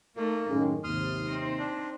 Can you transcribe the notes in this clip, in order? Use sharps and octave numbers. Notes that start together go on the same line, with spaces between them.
A3 A#3 D#4
F#2 A2 D#3 G#3
D#2 G#2 C3 C6 D#6 F6
C4 D#4 C5
D4